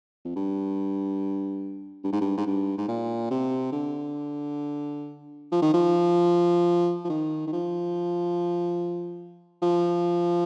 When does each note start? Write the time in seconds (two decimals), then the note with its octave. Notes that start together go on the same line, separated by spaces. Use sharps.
0.25 F2
0.35 G2
2.04 G2
2.12 G#2
2.21 G2
2.37 G#2
2.46 G2
2.78 G#2
2.88 A#2
3.30 C3
3.72 D3
5.52 F3
5.62 D#3
5.74 F3
7.04 F3
7.09 D#3
7.47 D#3
7.52 F3
9.62 F3